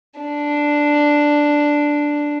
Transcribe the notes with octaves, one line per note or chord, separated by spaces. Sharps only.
D4